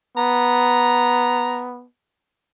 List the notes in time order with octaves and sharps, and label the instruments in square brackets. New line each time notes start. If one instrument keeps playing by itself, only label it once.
[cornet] B3 [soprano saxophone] A#5